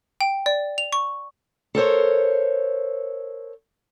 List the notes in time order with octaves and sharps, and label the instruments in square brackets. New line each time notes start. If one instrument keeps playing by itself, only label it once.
[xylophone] G5
D5
F7
C#6
[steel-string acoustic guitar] A4 A#4 C5 C#5